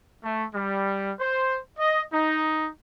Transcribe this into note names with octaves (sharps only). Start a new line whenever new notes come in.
A3
G3
C5
D#5
D#4